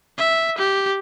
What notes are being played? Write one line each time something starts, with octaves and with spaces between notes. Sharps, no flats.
E5
G4